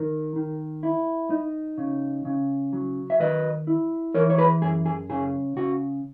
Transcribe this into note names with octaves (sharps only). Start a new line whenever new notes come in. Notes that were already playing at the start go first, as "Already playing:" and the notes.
Already playing: D#3 A#4
D#3
E4
D#4
C#3
C#3
F#3
E5
D#3 B4 D#5
E4
E3 A#4 C#5
C#5
G#4 B4
F#2 G#4
G#4
C#3 G#4
C#3 F#4